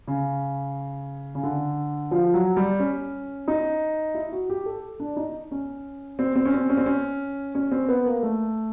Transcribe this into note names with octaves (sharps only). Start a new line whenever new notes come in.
C#3
C#3
D3
F3
F#3
G3
C#4
D#4
E4
F#4
G4
A4
D4
D#4
C#4
C4
C4
C#4
C4
C#4
C4
C#4
C#4
C4
B3
A#3
A3